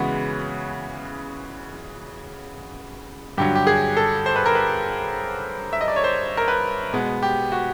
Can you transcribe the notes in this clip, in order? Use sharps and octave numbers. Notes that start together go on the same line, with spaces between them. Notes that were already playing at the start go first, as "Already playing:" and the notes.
Already playing: C#3 E3 G#3 B3 F#4
G2 D3 F#3 G4
G4
G#4
A4
C5
B4
A#4
B4
E5
D#5
D5
C#5
C5
A#4
B4
B2 G#3 B3
G4
F#4